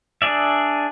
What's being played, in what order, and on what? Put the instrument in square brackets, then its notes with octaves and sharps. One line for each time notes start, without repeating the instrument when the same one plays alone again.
[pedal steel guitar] D4 G#4 D5 E5